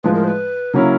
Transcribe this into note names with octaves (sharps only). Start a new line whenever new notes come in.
A2 F3 G#3 B4
A#4
C5
B4
C#3 F#3 A#3 C#4 E4 A#4